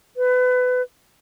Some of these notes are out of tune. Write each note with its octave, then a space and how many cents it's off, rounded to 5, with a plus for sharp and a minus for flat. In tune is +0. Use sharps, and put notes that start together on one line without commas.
B4 +25